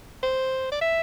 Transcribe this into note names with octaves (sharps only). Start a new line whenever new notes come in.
C5
D5
E5